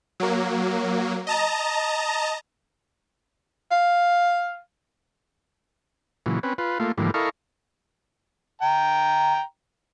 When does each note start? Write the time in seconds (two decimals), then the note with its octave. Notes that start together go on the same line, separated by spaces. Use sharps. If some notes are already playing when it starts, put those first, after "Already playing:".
0.20 F#3 A#3
1.27 D#5 A5 A#5
3.71 F5
6.26 A#2 C#3 E3 F#3
6.43 C4 C#4 B4
6.58 F4 B4
6.80 A3 A#3 F4
6.98 G#2 D3 E3 F3 G3 A#3
7.14 E4 A4 A#4 D#5 F5 C#6
8.62 G5 A#5